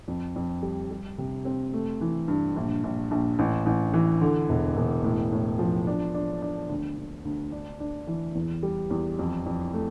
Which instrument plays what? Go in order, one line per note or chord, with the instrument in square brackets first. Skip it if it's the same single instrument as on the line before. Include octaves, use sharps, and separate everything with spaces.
[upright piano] F2
F2
G3
G3
C3
C4
A3
E3
G2
A#1
A#1
A#1
A1
A1
E3
D3
E1
E1
A2
A2
F3
D4
D4
D4
D2
D2
D2
D4
D4
E3
E2
G3
E2
F2
F2
A3